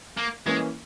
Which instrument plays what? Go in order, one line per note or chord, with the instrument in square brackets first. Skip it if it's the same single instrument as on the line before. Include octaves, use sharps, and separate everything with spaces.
[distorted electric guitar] A#3
[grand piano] E3 A#3 C#4 [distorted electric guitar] G#3